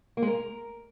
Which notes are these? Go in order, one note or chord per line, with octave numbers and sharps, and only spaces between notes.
A#3
G#3
A#4